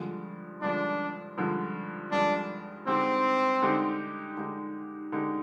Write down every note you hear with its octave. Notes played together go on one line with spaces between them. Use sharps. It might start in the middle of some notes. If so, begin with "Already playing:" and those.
Already playing: G2 D3 F3 G#3
G2 D3 F3 G#3 D4
G2 D3 F3 G#3
G2 D3 F3 G#3 D4
D3 G#3 C4 D#4 G4
D3 G#3 D#4 G4
D3 G#3 D#4 G4
D3 G#3 D#4 G4